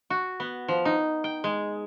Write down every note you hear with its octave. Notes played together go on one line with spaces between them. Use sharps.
F#4
B3
F3
D#4
G5
G#3